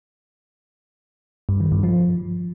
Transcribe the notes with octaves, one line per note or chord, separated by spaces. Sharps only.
G2
D#3
G2
F3